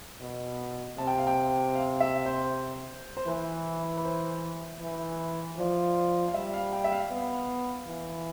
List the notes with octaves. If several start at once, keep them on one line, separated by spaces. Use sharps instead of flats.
B2
C3 A5
G5
F5
G5
F5
E5
C5
C5
E3 B4
B4
C5
E3
F3 D5
F5
G3 E5
F5
G5
E5
F5
B3
E3